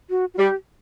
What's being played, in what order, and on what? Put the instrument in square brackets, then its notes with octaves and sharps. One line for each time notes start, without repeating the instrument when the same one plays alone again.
[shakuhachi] F#4
F#4
[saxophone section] G3 [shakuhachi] G4